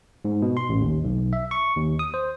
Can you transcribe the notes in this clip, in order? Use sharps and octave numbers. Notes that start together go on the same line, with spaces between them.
G#2
B2
C6
A1
D#2
B1
E5
C#6
D#2
D#6
C5